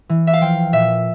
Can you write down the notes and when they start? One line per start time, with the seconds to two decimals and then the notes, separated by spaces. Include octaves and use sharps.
0.09 E3
0.27 E5
0.33 F5
0.41 F3 G5
0.72 A#2 E5